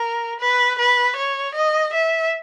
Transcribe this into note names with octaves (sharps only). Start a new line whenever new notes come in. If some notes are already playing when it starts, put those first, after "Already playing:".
Already playing: A#4
B4
B4
C#5
D#5
E5